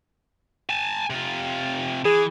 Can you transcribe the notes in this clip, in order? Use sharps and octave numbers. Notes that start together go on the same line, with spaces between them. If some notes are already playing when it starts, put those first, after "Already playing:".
G#5 A5
C3 F4
E3 G#4